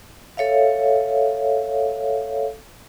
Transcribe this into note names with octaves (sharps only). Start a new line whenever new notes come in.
A4 C#5 E5 F5